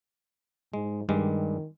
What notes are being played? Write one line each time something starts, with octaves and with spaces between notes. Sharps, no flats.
G#2 G#3
G2 D#3 G3 G#3